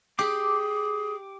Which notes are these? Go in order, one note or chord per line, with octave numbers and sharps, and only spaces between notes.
G4 G#4 D6